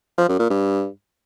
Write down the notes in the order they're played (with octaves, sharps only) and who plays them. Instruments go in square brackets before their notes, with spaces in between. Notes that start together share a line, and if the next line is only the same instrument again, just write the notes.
[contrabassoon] F3
F#2
A#2
G2